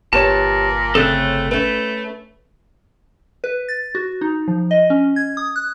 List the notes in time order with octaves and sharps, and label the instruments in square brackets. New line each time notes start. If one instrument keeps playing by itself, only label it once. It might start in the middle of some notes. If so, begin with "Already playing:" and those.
[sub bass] G1 [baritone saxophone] A#2 [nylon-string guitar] G4 B4 C#5 [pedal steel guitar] A5
[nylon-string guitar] C#3 C4 C#4 [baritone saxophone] A3 [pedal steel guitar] A4 F#6
[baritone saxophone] A3 [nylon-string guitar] C#4 B4
[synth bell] B4
A6
F#4
D#4
F3
D#5
C#4
G#6
D#6
F#6